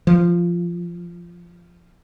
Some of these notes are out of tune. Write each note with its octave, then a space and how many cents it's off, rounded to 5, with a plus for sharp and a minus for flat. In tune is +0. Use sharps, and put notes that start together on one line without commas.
F3 -10